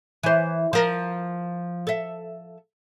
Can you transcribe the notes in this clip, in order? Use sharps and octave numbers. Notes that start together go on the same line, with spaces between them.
E3 C5
F3 A#4
A4 E5